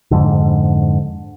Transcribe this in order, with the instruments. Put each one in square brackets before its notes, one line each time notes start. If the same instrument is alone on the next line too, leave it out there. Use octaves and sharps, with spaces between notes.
[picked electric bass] F2 G#2 D3